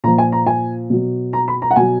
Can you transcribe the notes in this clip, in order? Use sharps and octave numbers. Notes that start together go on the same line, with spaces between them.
A#2 F3 A#5
G#5
A#5
G#5
B2 F#3
A#5
B5
A#5
F#5
B2 F#3 G#5